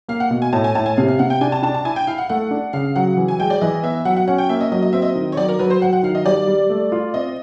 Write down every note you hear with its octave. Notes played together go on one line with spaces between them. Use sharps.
A#3 F5
F#5
B2
G#5
A2 A5
G#5
A2 A5
G#5
C3 F5
F5
C3 F#5
G5
D4 G#5
A5
D4 A5
A5
E4 G#5
G5
E4 F5
F#5
A3 F#5
D4
C#3 F5
F#3 F#5
E3
G#5
G#3 G5
D5
E3 D#5
B3 E5
F#3 F#5
F#5
C#4 F#5
G5
A#3 E5
D#5
F#3 D#5
D#5
C4 E5
D#5
D#3
C#5
F#3 D5
A#4
F#3 B4
C5
F#3 F#5
F#5
D#3 F5
D#5
G3 D5
G3
A3
F4
C4 D#5